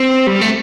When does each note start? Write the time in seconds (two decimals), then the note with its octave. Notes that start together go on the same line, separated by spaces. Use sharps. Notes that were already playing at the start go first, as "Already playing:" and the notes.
Already playing: C4
0.27 G3
0.41 A3